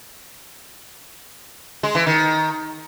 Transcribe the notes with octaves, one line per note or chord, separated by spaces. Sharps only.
G#3
E3
D#3